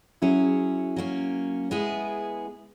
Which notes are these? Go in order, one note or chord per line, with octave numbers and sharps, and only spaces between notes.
F#3 C#4 E4 G#4
F#3 A#3 C#4
G#3 B3 E4 G#4